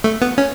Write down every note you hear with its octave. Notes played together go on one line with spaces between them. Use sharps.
A3
B3
C#4